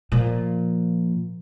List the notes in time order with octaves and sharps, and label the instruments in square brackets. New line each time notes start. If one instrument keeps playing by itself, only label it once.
[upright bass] A#2 F3